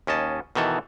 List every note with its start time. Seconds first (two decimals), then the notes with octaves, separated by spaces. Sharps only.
0.07 D#2 C#4 D#5 A5
0.55 B2 D#3 E3 A4